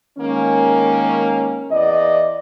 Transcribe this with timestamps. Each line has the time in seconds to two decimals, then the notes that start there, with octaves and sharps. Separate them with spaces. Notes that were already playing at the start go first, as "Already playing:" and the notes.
0.18 D#3 G#3 A#3 C#4
1.71 E2 D5 D#5